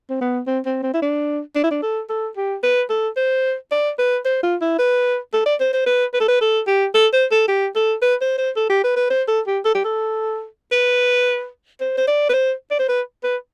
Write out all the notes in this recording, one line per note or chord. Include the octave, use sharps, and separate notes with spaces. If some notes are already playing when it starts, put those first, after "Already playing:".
C4
B3
C4
C4
C4
E4
D4
D4
E4
D4
A4
A4
G4
B4
A4
C5
D5
B4
C5
F4
E4
B4
A4
D5
C5
C5
B4
B4
A4
B4
A4
G4
A4
C5
A4
G4
A4
B4
C5
C5
A4
G4
B4
B4
C5
A4
G4
A4
G4
A4
B4
C5
C5
D5
B4
C5
D5
C5
B4
B4